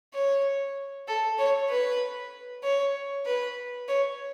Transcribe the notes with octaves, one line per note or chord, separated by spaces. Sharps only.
C#5
A4
C#5
B4
C#5
B4
C#5